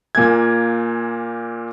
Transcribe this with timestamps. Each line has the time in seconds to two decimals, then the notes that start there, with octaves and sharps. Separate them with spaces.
0.15 A#2 A#3 G#5 G#6